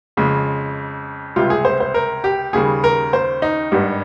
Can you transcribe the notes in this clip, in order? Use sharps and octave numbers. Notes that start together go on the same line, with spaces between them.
F2 C#3 G#3
C#2 C3 G3 F4
G#4
C5
C5
A#4
G4
D#2 C#3 G3 G#4
A#4
C5
D#4
G#1 G2 G3